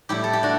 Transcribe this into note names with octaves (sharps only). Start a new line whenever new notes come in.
A2 G3 E4 G4
A4
G4
D4 F#4